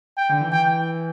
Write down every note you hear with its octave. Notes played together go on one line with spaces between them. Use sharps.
G5
D3
E3
E3 G5